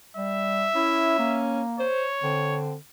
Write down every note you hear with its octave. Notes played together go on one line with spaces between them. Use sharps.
G3 E5
C#4 E4
A#3
C5 C#5
D3 C4